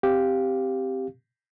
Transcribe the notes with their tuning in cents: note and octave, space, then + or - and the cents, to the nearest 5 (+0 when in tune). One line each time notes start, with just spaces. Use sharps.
C4 +0 G4 +0 F5 +0